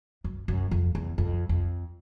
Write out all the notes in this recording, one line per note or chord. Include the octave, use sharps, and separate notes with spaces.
F#2
F#2
F2
E2
F2
F2